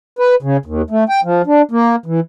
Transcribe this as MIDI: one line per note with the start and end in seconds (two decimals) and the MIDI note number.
0.19 0.35 71
0.42 0.57 49
0.66 0.82 39
0.90 1.04 57
1.09 1.21 79
1.23 1.42 53
1.46 1.62 62
1.71 1.96 58
2.06 2.20 52